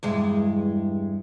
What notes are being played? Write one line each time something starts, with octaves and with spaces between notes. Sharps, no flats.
E2 G2 G#3